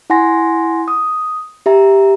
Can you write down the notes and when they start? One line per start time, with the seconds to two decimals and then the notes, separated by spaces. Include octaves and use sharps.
0.10 E4 F#5 G#5 C6 A#6
0.88 D#6
1.66 G4 E5 A#5